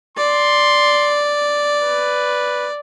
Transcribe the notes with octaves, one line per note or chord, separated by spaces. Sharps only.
D5 C6
B4